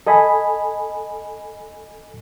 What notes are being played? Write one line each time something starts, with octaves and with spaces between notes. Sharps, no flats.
A4 D#5 G#5 B5